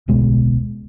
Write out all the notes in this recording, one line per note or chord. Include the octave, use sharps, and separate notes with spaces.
D1 B1 B2 G#3